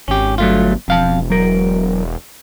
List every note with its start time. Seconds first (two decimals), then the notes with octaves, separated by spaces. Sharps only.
0.08 G#1 C#4 G4
0.38 G1 F#3 A3 F4
0.88 E1 F2 F5 A5
1.30 F#3 A#4